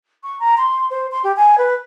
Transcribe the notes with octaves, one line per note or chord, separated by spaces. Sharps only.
C#6
A#5
C6
C5
C6
G4
G#5
B4